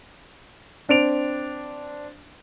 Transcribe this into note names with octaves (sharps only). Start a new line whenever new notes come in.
C4 D4 C5 D7 F7